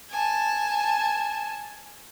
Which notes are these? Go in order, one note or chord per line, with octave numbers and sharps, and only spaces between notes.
G#5 A5